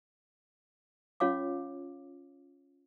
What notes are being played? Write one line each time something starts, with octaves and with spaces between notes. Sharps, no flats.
C#4 F4 C#5 F5 D6